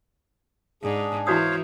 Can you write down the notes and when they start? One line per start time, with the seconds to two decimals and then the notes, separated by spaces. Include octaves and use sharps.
0.83 G#2 D4 G#4
1.27 E3 E4 F#4 C5 C#5 F5 D#6